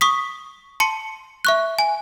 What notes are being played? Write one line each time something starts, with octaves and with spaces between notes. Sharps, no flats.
C#6 D#6 B6
A5 C6 C#7
E5 C#6 F#6
G#5